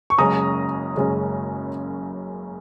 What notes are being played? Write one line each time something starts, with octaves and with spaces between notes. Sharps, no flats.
C#6
F#1 F#2 C#3 G#3 C#4 A#5 D#6
F#1 F#2 C#3 G#3 C#4